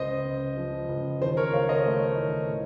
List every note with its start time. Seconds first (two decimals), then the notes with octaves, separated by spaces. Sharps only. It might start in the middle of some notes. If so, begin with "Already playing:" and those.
Already playing: C#2 C5 D#5
0.25 C#3
0.57 F3
0.89 C#2
1.21 D#2 C5
1.37 A#4 C#5
1.53 C#3 C#5 F5
1.69 C5 D#5
1.86 A3
2.18 D#2
2.49 A2